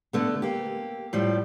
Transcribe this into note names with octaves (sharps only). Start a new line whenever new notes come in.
D3 A3 B3
A#3 G4
A2 F3 G3